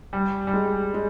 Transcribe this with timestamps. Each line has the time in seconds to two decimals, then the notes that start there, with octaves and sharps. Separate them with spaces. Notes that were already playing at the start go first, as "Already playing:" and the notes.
0.13 G3
0.47 G3
0.54 G#3
0.94 G#3